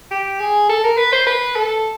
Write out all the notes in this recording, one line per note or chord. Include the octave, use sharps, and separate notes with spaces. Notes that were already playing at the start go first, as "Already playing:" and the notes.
G4
G#4
A4
A#4
B4
C5
B4
A4